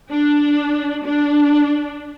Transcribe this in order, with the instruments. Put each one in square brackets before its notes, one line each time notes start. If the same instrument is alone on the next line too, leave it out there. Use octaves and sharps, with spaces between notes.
[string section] D4
D4